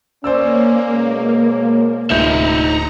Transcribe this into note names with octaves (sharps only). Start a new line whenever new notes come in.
A#3 C#4 C5 D5 E6
B2 G#3 C#5
D1 C3 D#4 F4 E5 A#5 G6